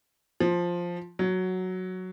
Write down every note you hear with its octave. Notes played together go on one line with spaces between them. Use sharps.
F3
F#3